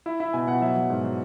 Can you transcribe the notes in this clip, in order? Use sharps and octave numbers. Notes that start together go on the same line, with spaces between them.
E4 E5
E4 E5
B2 G#5
B2 F#5
F#3 E5
F#3
G#2
F#3